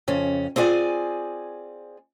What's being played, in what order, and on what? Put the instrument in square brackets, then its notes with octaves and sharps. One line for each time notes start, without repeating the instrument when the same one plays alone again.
[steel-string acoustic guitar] F2 C#3 C#4
C4 F4 G#4 D5 G#5